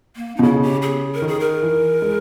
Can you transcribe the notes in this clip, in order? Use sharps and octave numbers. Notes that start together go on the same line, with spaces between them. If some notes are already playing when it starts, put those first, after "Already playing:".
A#3
D#4
B2
C#3 E4
G4
G#4
A#4
D#3
G#4
A#4
E3
G#3